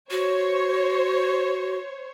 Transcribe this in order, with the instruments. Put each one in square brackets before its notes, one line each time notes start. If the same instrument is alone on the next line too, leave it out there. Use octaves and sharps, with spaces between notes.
[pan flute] F#4 [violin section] C5 C#5